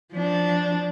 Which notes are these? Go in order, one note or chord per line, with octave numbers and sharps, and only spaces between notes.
F3 D4